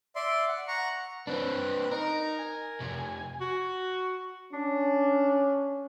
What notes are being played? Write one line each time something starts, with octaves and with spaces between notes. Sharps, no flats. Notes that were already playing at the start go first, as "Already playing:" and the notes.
D5 E5 C6
F#5
F#5 A#5 C#6
C4 D4 B4
D#4 A#4
G#5
F2 C3
F#4
C#4 D4